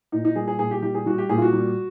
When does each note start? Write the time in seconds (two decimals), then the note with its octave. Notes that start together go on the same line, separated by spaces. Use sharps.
0.12 A#2 D#4
0.25 D#4
0.36 G3 G#4
0.48 G#4
0.59 A#2 G#4
0.71 G4
0.82 G3 G4
0.95 G#4
1.06 G3 F#4
1.18 G4
1.29 A#2 G#4
1.38 F4
1.42 F#4
1.53 G3